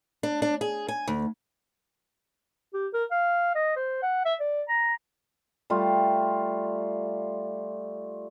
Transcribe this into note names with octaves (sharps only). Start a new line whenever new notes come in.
D4
D4
G#4
G#5
D2
G4
A#4
F5
D#5
C5
F#5
E5
D5
A#5
G3 A3 F4